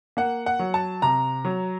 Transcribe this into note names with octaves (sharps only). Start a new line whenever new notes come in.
A#3 F#5
F#5
F#3
A5
C3 A#5
F#3